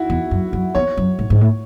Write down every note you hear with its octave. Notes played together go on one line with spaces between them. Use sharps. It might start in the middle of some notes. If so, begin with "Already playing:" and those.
Already playing: E4 F#4
E2
F#2
F#2
E2 C#5
F#2
G#2
G#2
A2